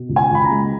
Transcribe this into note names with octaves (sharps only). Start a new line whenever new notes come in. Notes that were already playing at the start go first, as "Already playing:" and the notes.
Already playing: B2
C#2
G#5
C#2 B5
A#5
G#3